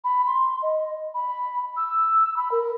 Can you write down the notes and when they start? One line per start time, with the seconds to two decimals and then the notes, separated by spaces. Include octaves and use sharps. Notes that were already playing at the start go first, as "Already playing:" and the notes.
0.04 B5
0.27 C6
0.62 D#5
1.14 B5
1.77 E6
2.36 B5
2.52 A#4